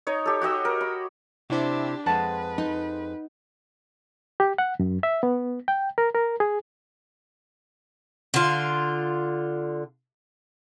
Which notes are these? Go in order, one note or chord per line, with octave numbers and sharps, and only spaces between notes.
D#4 C#5 D#5
G4 A4
F#4 G4 D#5 E6
A#4
B5
C3 D4 E4 G4 C5
F2 G#3 B4 F#5 A5
D#4
G4
F#5
F#2
E5
B3
G5
A#4
A#4
G#4
D3 F4